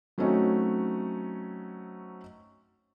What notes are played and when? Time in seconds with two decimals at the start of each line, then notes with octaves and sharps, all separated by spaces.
0.18 F#3 A3 C4 C#4 D#4 F#4